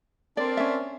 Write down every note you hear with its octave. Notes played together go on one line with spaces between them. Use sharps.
C4 D4 A#4 D5
C#4 E5